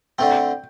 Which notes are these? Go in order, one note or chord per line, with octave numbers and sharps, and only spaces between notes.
D3 A3 C4 G5